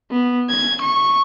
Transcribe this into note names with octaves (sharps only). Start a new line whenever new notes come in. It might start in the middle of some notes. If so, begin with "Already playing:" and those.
B3
G#6
C#6